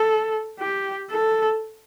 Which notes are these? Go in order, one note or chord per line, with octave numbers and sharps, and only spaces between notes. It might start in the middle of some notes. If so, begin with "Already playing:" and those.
Already playing: A4
G4
A4